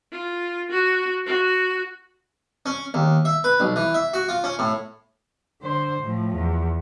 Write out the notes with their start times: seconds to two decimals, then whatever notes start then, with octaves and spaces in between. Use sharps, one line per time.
0.12 F4
0.71 F#4
1.26 F#4
2.66 C#4
2.94 D#2
3.25 E5
3.44 B4
3.60 B1
3.76 E3
3.94 E5
4.14 F#4
4.29 F4
4.44 C#4
4.59 A2
5.62 D3 C5
6.02 A2 F3
6.35 E2